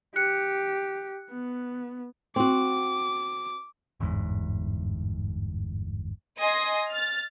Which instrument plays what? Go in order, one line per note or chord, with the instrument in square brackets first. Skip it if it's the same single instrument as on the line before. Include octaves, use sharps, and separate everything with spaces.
[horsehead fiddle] G4 [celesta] F#6 C#7
[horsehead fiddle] B3
[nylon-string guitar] C4 F#4 [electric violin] D6
[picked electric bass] G1 E2 G#2
[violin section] D#5 G#5 C6 D#6 A#6
F6 A6